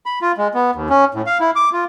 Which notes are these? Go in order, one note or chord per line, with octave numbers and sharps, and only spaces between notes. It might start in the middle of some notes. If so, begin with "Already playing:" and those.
B5
F4
G#3
B3
D#2
C#4
A2
F5
E4
D6
F4